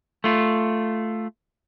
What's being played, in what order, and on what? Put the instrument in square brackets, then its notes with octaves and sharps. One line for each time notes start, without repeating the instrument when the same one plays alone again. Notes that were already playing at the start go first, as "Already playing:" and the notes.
[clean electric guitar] A3 F4